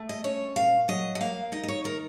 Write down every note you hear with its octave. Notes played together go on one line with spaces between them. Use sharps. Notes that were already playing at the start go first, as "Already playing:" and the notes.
Already playing: A3
D#5
C#4 C#5
A#2 F5
F#3 D#5
D#5
A#3 F5
D#4 D#5
D#5
C#5
D#3 A#4